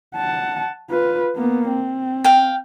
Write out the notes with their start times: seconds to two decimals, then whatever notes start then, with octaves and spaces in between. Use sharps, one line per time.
0.15 F#5 A5
0.90 F4 B4
1.36 A#3 B3
1.69 C4
2.24 F5 G5